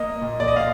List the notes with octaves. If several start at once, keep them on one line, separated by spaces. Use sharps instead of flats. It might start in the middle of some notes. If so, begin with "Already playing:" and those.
Already playing: A#3 D#5
A#2
D5
D#5
A#2 F5